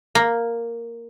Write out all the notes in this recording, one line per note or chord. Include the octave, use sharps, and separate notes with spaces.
A#3